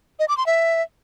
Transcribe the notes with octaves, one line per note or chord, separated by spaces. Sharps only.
D#5
D6
C6
E5